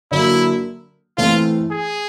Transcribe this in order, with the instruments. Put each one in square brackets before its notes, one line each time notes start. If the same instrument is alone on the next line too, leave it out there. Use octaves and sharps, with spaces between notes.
[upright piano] D3 F#3 A#3 [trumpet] E4
[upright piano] E3 A3 C4 [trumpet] F4
[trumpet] G#4